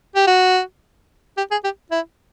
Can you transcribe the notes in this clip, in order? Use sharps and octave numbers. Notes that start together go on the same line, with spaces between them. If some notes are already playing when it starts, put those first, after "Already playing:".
G4
F#4
G4
G#4
G4
E4